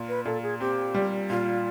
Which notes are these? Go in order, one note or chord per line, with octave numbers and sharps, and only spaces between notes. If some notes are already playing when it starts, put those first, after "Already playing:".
Already playing: A#2
B4
A#2 A4
G#4
C4 G4
G3
A#2 F4